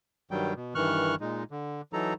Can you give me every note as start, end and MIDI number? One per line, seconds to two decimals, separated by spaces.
0.31 0.53 43
0.31 0.53 51
0.31 0.53 54
0.31 0.53 55
0.31 0.53 79
0.55 0.74 47
0.75 1.15 43
0.75 1.15 51
0.75 1.15 52
0.75 1.15 85
0.75 1.15 89
0.75 1.15 90
1.21 1.44 46
1.21 1.44 56
1.21 1.44 63
1.51 1.81 50
1.93 2.14 52
1.93 2.14 54
1.93 2.14 63
1.93 2.14 69
1.93 2.14 82